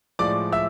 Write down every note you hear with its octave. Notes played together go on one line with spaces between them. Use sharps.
A2 F3 G#3 D5 D6
E5 E6